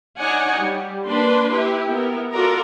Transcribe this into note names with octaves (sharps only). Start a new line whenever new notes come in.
D4 D#4 C#5 D5 F#5 G#5
G3
A#3 D4 B4 D5 C6
E4 G4 B4
B3 E4 A#4
F4 F#4 A4 A#4 D5 A#5